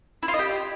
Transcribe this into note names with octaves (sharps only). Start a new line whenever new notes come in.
E4
F4
D#5
G4